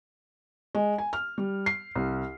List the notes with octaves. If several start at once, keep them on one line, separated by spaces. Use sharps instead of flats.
G#3
G#5
F6
G3
C7
C2